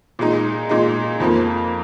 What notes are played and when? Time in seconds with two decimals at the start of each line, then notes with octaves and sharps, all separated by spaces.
0.19 A#2 G#3 D#4
0.69 A#2 G#3 D#4
1.20 F2 F3 A#3